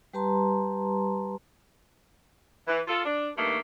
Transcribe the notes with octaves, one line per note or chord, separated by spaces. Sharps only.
G3 G4 B4 A5 A#5 C6
E3
F4 A4
D4
G2 D#3 A3 A#3